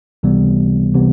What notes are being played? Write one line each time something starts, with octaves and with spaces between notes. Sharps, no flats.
C#2 C3 E3 G3 B3
C3 E3 G3 B3